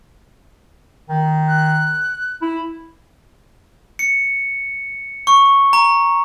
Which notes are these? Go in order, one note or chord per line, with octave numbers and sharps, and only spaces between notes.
D#3
F#6
E4
C#7
C#6
A#5